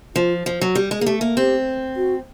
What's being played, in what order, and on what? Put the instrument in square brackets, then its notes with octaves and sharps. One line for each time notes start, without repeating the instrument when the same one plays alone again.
[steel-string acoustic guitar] F3 [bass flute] F4
[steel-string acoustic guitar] F3
F#3
[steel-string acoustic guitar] G3 [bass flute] G4
[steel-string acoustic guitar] G#3
[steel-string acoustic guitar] A#3 [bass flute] G#4
[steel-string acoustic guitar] A3 [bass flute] G4
[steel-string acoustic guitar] A#3
[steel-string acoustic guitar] C4 [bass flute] G4
[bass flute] F#4